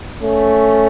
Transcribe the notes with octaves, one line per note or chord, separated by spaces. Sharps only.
A3 C#4